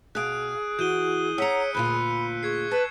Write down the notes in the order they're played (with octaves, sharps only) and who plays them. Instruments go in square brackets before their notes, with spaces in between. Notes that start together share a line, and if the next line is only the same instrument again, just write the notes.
[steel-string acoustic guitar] B2 F5 [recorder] G#4 [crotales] F#6 D7
[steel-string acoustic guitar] E3 [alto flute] F#4 [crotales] G6 D#7 G7
[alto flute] C#5 [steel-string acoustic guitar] F#5 A#5 [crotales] E6 B6 C#7
[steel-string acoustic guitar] D2 A#2 F4 [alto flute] B5 [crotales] F#6
[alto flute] G#4 [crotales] C#6 G#6 C7
[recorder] B4 [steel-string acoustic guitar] A5